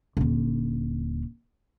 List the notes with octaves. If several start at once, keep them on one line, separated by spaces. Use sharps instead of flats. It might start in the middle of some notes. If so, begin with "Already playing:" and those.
D#1 D3